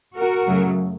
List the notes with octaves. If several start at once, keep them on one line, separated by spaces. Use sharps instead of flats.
F#4 A#4
F#2 C#3 F#3 A3